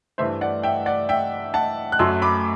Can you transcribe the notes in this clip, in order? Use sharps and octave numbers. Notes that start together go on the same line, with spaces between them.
G2 E3 A3 C5 E5
D5 F#5
E5 G5
D5 F#5
E5 G5
F#5 A5
F#6
F#2 F#3 A3 C6 E6
B5 D6